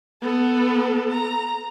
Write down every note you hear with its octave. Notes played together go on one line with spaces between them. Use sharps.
B3 A4
A#5